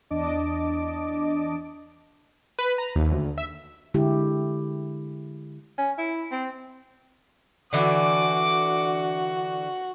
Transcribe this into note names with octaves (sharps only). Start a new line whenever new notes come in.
E2 D4 D#5 A5 D6 D7
B4
A#5
D#2
D2
E5
D3 G#3 E4 G4
C#4
E4
C4
D3 E3 F#4 D6